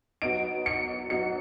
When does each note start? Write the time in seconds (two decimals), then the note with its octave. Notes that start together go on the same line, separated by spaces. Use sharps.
0.22 F#3 B3 D#4 D7
0.66 C#7
1.10 F#3 B3 D#4 C#7